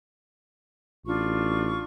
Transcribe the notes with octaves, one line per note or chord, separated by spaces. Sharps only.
A1 D4 F4 C#6